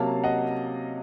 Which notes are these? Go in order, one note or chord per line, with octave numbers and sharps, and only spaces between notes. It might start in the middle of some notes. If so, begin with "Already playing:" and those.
Already playing: C3 F#3 A#3 C#4 F5 A5
D#5 F#5